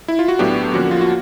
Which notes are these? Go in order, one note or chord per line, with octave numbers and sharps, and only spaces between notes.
E4
F4
F#4
A2 F#3 B3 D4 G4
D3 F3 A#3 C#4 F#4
F4
F#4